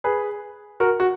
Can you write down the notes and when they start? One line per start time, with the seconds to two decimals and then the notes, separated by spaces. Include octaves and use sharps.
0.04 G#4 B4
0.80 F#4 A#4
1.00 F#4